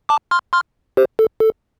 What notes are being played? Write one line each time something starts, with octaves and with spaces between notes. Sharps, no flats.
A5 D6
C6 F6
C6 F6
G4 C5
A4
A4